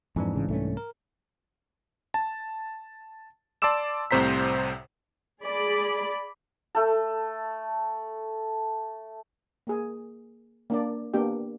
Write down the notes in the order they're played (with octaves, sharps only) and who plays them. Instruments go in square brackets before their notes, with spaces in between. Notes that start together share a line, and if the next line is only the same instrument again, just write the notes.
[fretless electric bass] F2 [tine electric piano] G#2 E3 D4
[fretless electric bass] A1 C#3
C2 A3 C#4
[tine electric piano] A#4
[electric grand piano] A5
D5 A5 C6 D6 E6 E7
C2 A2 C3 C5 A#5 B6
[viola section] G#4 D5 B5
[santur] A3 A4
[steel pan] A#3 G#4
A#3 D4 D5
A#3 B3 D4 G4 G5